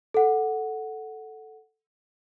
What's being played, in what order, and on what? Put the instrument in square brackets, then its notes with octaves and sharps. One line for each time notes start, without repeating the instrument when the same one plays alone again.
[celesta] A4 F#5